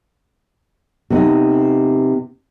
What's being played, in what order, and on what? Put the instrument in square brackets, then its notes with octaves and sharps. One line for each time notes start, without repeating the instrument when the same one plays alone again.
[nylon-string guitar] C3 B3 D#4